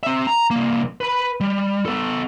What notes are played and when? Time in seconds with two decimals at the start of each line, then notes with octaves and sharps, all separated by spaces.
0.03 C4 E5
0.27 A#5
0.50 C2 A#3
1.01 B4 B5
1.40 G3
1.86 B3 A4